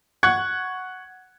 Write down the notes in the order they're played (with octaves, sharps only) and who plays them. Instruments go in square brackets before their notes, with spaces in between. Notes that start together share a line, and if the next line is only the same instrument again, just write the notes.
[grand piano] F#5 C#6 F#6 G#6 C#7